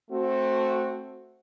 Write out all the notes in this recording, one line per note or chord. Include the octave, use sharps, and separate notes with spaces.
A3 C4 F#4